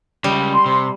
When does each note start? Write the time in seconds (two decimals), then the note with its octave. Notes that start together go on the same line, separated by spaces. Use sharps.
0.24 C#3 G3 G#3
0.52 C6
0.66 C3